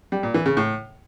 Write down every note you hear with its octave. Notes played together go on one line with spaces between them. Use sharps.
G3
A#2
E3
C#3
A2